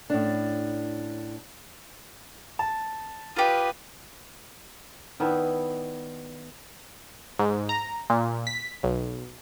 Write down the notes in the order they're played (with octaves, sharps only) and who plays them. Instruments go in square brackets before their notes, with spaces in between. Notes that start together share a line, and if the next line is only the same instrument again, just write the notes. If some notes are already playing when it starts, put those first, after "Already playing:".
[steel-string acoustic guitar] A2 C#4 D4
[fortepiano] A5
[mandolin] F4 G4 [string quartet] B4 F5 D#6
[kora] D#3 B3 D4 E4
[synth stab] G#2
A#5
A#2
B6
B1